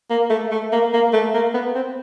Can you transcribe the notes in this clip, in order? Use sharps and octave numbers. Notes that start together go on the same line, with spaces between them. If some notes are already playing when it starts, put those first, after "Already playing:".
A#3
A3
A3
A#3
A#3
A3
A#3
B3
C4